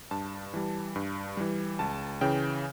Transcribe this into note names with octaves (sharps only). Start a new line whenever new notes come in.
G2 A5
E3 G3
G2
E3 G3
C#2 A5
C#3 E3 G5